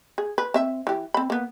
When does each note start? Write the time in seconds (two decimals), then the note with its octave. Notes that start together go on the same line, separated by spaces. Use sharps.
0.18 G#4
0.38 B4
0.54 C4 E5
0.87 E3 G4
1.14 C4 B5
1.30 A#3 B3